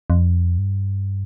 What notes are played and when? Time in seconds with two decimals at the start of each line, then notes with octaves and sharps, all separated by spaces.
0.10 F2
0.58 G2